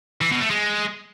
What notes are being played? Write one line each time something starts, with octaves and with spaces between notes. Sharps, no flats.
E3
B2
A3
G#3